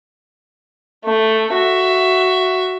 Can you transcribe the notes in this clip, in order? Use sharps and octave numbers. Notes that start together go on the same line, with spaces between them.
A3
F#4 E5